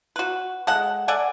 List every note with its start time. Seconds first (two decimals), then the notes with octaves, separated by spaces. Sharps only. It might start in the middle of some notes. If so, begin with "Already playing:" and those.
0.16 F#4 B4
0.67 G#3 A4 F#5
1.08 A4 D5 F#5 G#5